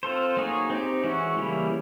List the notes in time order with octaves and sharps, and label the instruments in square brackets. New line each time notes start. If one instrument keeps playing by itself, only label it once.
[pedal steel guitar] C4 F4 A4 C5
F#3 A#3 D#4 G#4 C#5
C4 D#4 G4
E3 G#3 C#4 F#4
C#3 E3 G3 A#3 C#4